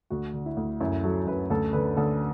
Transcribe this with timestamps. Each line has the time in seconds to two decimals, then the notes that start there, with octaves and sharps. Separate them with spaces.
0.10 D2 F#4
0.33 D3
0.46 E4
0.57 D2
0.81 F#2 E4
1.04 F#3 A4
1.27 F#2 B4
1.50 D2 A4
1.73 D3 B4
1.97 D2 A4